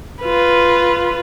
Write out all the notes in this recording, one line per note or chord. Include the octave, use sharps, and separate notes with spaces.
F4 B4